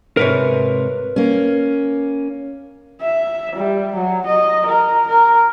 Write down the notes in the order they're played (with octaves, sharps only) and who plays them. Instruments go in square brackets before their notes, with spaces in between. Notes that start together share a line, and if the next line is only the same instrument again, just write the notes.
[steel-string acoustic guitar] G#2 C3 [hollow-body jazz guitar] A#4 B4 C#5
[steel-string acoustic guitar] A#3 C#4
[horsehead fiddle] E5
G3
F#3
D#5
A#4
A#4